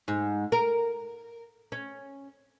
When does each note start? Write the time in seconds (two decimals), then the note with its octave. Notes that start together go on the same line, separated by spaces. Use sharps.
0.08 G#2
0.52 A#4
1.72 C#4